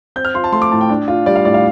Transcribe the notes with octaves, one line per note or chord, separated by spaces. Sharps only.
C4 G6
F6
F4 C6
A5
A3 C6
D6
A2 A5
G5
D4
F4
G3 D5
F5
A2 D5
F5